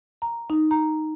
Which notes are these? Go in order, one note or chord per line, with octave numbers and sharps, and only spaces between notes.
A#5
D#4
A#5